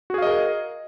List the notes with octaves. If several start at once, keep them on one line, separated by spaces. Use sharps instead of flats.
F#4 G#4 A#4 D#5 F5